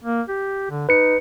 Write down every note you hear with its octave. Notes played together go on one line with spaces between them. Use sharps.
A#3
G4
D3
D#4 B4 C#7